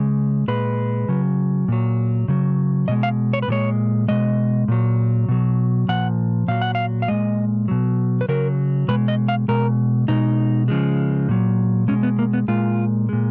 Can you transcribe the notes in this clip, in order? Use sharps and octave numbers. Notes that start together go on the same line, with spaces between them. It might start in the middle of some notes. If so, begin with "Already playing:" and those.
Already playing: C#3 G#3
A#2 G#3 B4
C#3 F#3
A#2 F#3
C#3 F#3
B2 G#3 D#5
F5
C#5
B4
A#2 F3 G#3 C#5
B2 G#3 D#5
A#2 F#3
B2 F#3
A#2 F3 F#5
A#2 F#3 F5
F#5
F5
F5
A#2 G#3 D#5
B2 F#3
B4
C#3 F#3 A#4
B2 G#3 B4
D#5
F5
B2 G#3 A#4
B2 G#3 D#4
C#3 F3 G#3
A#2 F#3
B2 G#3 C#4
B3
A#3
B3
A#2 G#3 F4
A#2 G#3